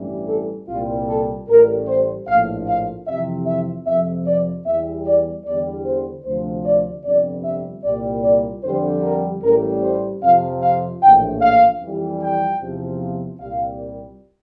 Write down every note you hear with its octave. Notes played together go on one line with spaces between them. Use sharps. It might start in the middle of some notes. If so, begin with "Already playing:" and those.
Already playing: A1 G2 E3 G3
A4
C2 A#2 G3 F4
A4
A1 A2 G3 A#4
C5
A#1 A2 F3 F5
F5
F2 C3 E3 E5
E5
F2 C3 F3 E5
D5
E2 E3 G3 E5
D5
E2 D3 G3 D5
C5
D2 C3 F3 C5
D5
G1 F2 C3 G3 D5
E5
C2 A#2 G3 D5
D5
F2 D3 G3 C5
A#4
A1 A2 G3 A#4
C5
F2 C3 F3 F5
F5
A#1 A2 E3 G5
F5
F2 E3 G3
G5
E2 C3 F3
C2 A#2 G3 F5